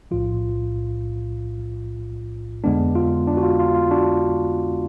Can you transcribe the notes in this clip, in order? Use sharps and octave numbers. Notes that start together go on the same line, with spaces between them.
B1 A2 F3 F4
F2 D3 G#3 B3 D4
F4
D4
F#4
F4
F4
F4
D4 F#4